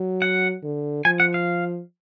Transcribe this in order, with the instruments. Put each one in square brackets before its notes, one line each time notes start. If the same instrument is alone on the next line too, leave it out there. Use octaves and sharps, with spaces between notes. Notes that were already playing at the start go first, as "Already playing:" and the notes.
Already playing: [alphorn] F#3
[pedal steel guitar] F#5
[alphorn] D3
[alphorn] F3 [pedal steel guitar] G#5
[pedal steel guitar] F#5
F5